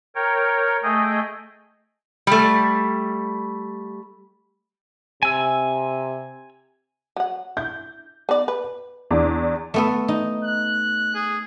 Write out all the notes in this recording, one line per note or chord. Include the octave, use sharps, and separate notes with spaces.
A#4 C#5 G5
A3 G#4 D#5 G5
G3 A3
C3 G#5 E6
F#3 F#5
E4 G6
B3 D#4 D5
B4
E2 D4 D6
A3 B3 A4
D#4
F#6
G#4